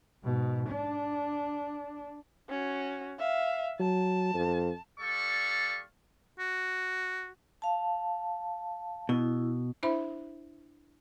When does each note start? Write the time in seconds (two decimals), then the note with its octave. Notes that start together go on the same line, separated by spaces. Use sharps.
0.24 G#2 B2
0.69 D4
2.50 C#4 F#4
3.19 E5 F5
3.80 F#3 A5
4.34 F2
5.00 G3 A4 D5 F5 C#6
6.39 F#4
7.62 F5 A5
9.09 B2 E4
9.83 D4 E4 C5 E5 B5